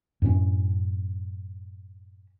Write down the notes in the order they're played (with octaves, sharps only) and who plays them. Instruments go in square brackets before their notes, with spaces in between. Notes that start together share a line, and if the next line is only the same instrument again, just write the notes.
[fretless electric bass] F#2 A2 A#3 C#4